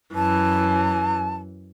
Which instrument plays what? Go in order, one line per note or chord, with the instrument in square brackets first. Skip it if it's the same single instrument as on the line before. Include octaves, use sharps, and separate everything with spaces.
[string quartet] F#2 E3 [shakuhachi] A5